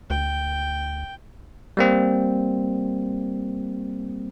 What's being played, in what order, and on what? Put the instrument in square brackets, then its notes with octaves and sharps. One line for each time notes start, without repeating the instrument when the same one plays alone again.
[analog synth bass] D2 [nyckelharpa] G5
[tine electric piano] G3 A#3 C4